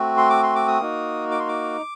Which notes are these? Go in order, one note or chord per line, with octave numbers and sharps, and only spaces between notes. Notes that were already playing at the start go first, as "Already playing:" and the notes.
Already playing: A3 C4 F#4
C6
D6
C6
D6
D#6
A#3 D#4 F#4
D6
C6
D6